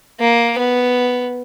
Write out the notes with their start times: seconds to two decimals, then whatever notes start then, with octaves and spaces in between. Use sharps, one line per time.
0.20 A#3
0.58 B3